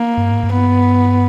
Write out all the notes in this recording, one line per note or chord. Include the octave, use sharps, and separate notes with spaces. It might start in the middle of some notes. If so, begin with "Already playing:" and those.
Already playing: A#3
G2
G#2
G2
B3